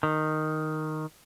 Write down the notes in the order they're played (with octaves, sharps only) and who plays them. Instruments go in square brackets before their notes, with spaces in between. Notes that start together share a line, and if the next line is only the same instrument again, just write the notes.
[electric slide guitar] D#3